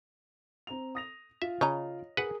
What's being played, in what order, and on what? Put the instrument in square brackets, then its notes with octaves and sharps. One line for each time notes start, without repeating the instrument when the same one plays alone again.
[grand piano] C4 A#5 F7
D#6 A#6 F7
[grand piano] F4 [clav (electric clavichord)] E5
[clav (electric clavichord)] C#3 [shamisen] C#5 D#5 A#5
[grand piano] G#4 A#4 [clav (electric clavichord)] B4 F#5